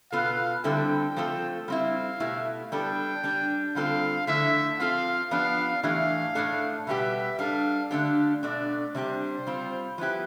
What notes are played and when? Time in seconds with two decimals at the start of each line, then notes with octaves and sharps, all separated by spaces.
0.12 B2 B3 F4 A4 F5
0.64 D3 G3 C4 E4 A4 G5
1.16 F3 A3 C4 F4 A4
1.68 G3 C4 E4 F5
2.20 B2 A3 E4 G4
2.72 G3 B3 D4 A4 G5
3.24 G3 D4 G4
3.75 D3 G3 C4 F4 A4 F5
4.27 D3 F3 A3 E4 E5
4.79 F3 C4 F4 A4 F5
5.31 F3 B3 D4 G4 F5
5.83 A2 E3 A3 D4 G4 F5
6.35 A2 E3 A3 D4 A4
6.87 B2 G3 B3 E4 G4 E5
7.39 G3 D4 A4 F5
7.90 D3 A3 D4 G4 F5
8.43 B2 A3 D4 D5
8.95 C3 G3 D4 G4 C5
9.47 G3 C4 F4
9.98 F3 B3 E4 G4